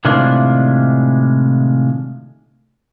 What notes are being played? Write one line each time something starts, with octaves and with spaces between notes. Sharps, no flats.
A2 C3 D#3 G#3 D4 F4